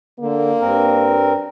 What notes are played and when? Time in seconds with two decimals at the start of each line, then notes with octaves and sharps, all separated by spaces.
0.20 D3 A#3
0.60 G2 C4 A#4